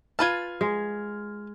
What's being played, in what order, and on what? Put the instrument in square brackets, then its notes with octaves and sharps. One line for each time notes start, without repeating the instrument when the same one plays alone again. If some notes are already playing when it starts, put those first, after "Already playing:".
[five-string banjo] F4 B4 A5 [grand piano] F6 G#6
[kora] G#3